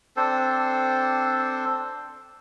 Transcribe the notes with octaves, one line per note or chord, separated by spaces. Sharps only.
C4 D4 A4 C5